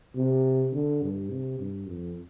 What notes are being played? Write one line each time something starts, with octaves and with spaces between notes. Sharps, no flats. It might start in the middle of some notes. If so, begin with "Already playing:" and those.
C3
D3
G2
C3
G2
F2